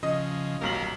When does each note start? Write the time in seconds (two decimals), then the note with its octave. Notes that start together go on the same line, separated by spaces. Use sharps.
0.03 C#3 F3 D#5
0.61 D#1 B1 A#3 F4 A#4 F#7